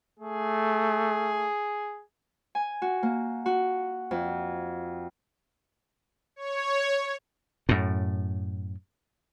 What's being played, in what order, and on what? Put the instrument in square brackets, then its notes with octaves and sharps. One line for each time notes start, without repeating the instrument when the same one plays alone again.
[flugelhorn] A3 [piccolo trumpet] G#4
[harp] G#5
F#4
A#3
F#4
F2
[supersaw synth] C#5
[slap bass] F#2 A2